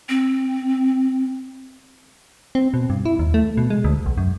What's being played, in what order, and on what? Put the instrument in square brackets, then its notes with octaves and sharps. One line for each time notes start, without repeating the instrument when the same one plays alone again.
[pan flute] C4
[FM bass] C4
B2
G2
E4
D#2
A3
B2
G#3
D2
B1
F#2